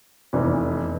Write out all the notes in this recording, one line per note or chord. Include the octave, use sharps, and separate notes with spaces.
F1 E2 E3